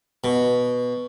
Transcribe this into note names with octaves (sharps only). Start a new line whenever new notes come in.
B2